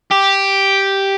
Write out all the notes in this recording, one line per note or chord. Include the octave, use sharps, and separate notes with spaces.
G4